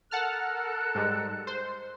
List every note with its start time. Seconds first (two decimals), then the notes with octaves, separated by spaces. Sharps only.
0.11 A4 A#4 F#5 A5 F6 F#6
0.95 G#2 G3 G#3
1.47 C5